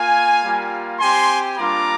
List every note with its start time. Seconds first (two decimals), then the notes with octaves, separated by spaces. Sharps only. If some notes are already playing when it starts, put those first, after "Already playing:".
Already playing: A#3 F4 F5 G#5
0.42 G3 A#3 F4
1.00 C4 G4 G#5 C6
1.57 G3 A#3 D4 F4 A#5 D6